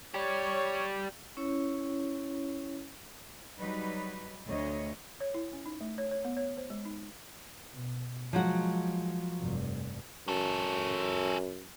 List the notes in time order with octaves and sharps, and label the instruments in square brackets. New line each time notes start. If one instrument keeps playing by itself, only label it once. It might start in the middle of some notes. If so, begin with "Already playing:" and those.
[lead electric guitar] G4 D5 [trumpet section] C#5
[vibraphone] C#4 E4 C#5
[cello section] F#3 G3 D#4 B4
D2 C#5 D#5
[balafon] C#5
E4
C#4
D#4
A3
C#5
C#5
B3
C#5
C5
G#3
D#4
[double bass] B2
[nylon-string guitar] F3 F#3 F#4 [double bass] G#3
[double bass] F1 G2
[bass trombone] F#2 [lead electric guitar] C#4 A4